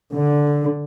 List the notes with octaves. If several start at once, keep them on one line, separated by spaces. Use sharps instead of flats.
D3